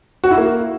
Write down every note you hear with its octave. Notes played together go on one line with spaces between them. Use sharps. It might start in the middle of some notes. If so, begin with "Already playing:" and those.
F#4
E4
A#3